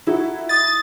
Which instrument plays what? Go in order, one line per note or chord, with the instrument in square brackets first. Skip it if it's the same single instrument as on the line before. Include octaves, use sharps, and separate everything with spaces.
[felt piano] D#4 E4 F#4 [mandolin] A4
[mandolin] D#5 D#6 [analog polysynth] A6